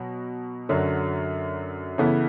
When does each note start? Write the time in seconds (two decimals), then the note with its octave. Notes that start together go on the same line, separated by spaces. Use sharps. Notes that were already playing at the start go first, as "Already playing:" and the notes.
Already playing: B2 F#3 F#4
0.69 F#2 D3 F#3
1.98 C#3 E3 B3 E4 A4